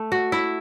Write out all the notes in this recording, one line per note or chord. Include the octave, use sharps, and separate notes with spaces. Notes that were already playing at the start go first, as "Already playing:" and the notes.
Already playing: A3
F#4
E4